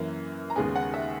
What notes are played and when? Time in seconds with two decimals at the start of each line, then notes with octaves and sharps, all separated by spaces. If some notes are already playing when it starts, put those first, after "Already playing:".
Already playing: F#2 E3 A#3
0.50 A#5
0.56 D#2 C#3 G#3 B3 G#5
0.76 F#5
0.94 E5